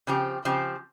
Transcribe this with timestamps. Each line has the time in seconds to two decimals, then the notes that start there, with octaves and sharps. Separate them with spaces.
0.07 C#3 F3 C4 G4
0.45 C#3 F3 C4 G4